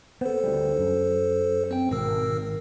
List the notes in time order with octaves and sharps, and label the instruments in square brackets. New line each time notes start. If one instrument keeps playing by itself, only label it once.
[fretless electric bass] B3 [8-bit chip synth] A4 C5
[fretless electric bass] D2 G3
F#2
[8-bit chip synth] C4 G5
[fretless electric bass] G#1 [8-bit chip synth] B2 A#4 E6